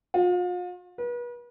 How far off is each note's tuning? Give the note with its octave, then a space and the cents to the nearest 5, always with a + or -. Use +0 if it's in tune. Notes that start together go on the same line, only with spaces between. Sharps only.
F4 +40
B4 -35